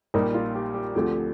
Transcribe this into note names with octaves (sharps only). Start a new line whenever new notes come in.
A#1 A#2 G3 A#3 D#4
F4
G4
G4
D2 D3 F3 C4 G4